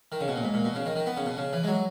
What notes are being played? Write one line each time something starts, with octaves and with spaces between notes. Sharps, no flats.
D#3
C#3
B2
A#2
G#2
A#2
B2
C#3
D#3
D#3
B3
C#3
B2
C#3
E3
G#3
F#3